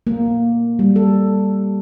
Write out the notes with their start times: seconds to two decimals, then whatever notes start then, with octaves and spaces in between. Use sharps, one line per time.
0.07 A#3
0.79 G3
0.96 A4